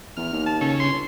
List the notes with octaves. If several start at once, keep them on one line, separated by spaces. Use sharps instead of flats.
E2 F6
D#2
A5
C#3 C#4 A4
G1 C6